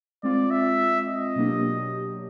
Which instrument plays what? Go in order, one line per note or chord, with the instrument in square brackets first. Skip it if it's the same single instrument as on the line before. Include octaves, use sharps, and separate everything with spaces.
[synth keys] G#3 C4 F4 [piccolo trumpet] D5
[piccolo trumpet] E5
D#5
[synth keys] B2 F#3 A#3 D4 G4